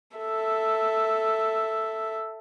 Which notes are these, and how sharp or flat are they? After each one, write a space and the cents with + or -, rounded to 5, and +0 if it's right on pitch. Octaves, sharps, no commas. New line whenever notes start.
A4 +5 E5 +0